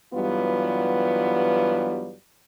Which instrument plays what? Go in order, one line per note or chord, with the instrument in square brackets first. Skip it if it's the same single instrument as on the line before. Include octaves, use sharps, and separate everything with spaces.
[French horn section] G2 E3 F#3 G3 B3 F4